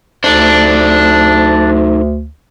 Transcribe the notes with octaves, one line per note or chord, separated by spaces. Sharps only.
D2 D4 D#4 A4 C5